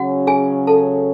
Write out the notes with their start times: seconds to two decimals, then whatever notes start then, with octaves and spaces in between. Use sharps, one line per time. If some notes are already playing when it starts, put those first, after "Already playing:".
Already playing: C#3 F#3 C#4 F#4 F#5
0.27 G#4 G#5
0.67 A4 A5